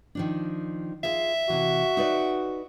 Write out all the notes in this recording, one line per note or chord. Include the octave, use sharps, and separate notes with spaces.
D#3 F3 D4
F4 G#4 E5 F5
C3 E3 F#4
D#4 B4 D5